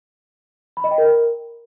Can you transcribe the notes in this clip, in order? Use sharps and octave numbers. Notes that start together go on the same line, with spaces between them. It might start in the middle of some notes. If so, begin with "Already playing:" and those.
B5
D#5
G5
A#4